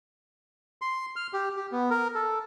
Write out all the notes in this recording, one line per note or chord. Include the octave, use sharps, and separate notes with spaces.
C6
F6
G4
G4
B3
A#4
A4